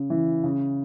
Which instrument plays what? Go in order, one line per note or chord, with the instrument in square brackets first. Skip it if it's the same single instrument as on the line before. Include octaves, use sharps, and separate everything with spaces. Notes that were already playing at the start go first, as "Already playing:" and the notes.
Already playing: [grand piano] C#3
E3
C#3